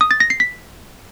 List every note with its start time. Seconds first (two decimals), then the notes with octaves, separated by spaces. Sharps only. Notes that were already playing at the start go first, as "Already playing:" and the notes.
0.01 D#6
0.11 A6
0.20 A#6
0.30 C7
0.40 B6